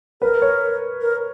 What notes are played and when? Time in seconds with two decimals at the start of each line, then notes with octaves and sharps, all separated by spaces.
0.21 A#4 B4
0.42 C#5
1.01 A#4